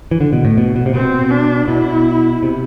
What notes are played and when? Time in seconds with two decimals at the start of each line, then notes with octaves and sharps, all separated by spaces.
0.11 E3
0.20 D3
0.33 B2
0.45 A2
0.58 B2
0.76 B2
0.86 C3
0.94 B2 C4
1.31 D4
1.68 B2 E4
2.43 C3